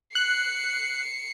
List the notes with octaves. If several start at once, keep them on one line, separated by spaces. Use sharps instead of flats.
F#6 C7 C#7